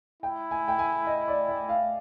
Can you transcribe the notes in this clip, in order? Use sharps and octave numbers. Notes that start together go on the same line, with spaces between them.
E4 G5
G#5
G5
G#5
D#5
D5
E5
F5